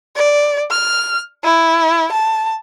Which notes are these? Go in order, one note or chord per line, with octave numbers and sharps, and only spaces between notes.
D5
F6
E4
A5